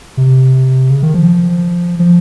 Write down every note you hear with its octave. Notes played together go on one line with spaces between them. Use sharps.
C3
C#3
D#3
F3
F3